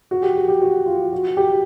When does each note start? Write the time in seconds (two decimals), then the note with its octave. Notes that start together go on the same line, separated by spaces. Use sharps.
0.11 F#4
0.23 G4
0.35 G#4
0.48 G4
0.61 F#4
0.86 F4
1.13 F#4
1.37 G4